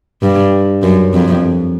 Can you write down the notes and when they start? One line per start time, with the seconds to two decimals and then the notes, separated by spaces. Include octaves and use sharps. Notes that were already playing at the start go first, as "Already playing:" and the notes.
0.22 G2
0.83 F#2
1.13 F2